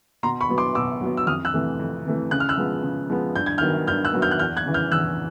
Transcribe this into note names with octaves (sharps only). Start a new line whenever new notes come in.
B2 A#5 C6
B5 C#6
F#3 B3
C6 D6
B2 D6 E6
F#3 B3
E6
F2 D#6 F6
E6 F#6
C3 E3 A3
F2
C3 E3 A3
C#3 F#6
F6
E6 F#6
F3 G#3 B3
C#3
F3 G#3 B3
G2 G6
G#6
D#3 F#3 B3 F6 G6
G2 F6 G6
E6 F#6
D#3 F#3 B3
F6 G6
F#6
E2 F6 G6
F#6 G#6
C#3 E3
F6 G6
E2 E6 F#6